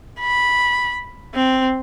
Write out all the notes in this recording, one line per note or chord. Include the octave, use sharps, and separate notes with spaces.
B5
C4